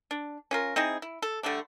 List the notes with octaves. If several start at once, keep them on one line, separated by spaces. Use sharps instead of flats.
D4
C#4 F4 A#4
C4 D#4 E4 G#4
E4
A4
D3 G3 A3 D4